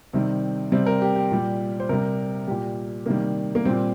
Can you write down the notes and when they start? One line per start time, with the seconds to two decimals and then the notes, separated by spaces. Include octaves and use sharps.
0.13 C3 D#3 G3 C4
0.72 C3 G3 C4
0.86 A#4
1.02 G4
1.16 G4
1.31 A#2 G3
1.80 C5
1.89 C3 G3 A#4
2.47 A#2 G3 G4
3.06 C3 D#3 G3 A#3
3.55 A#3
3.65 A#2 G3 C4